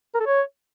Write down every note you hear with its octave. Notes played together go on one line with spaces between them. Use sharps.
A#4
A4
C#5